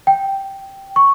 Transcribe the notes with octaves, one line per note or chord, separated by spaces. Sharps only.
G5
C#6